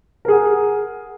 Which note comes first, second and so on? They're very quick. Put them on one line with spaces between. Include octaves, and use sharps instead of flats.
A#4 G#4 F#5